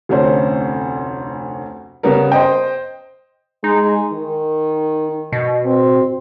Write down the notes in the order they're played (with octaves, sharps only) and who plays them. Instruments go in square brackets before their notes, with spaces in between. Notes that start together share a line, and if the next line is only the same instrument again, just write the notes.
[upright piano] F1 D2 C#4 C5
C#3 G3 B3 A#4
C5 D#5 G5
[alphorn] G#3 [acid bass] D#4
[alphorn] D#3
[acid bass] B2
[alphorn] C4